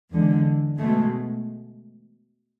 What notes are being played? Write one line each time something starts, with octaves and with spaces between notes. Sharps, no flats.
E2 D3 G#3
B2 G#3 A3